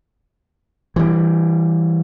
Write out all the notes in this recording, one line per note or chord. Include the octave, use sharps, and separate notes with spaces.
E3 G3